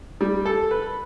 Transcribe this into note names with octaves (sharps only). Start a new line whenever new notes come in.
G3
A4
B4